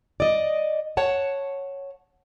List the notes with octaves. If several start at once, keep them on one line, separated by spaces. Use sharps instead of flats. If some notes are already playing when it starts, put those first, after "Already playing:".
D5 D#5
C#5 F#5 A5